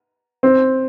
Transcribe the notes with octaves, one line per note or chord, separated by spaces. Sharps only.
C4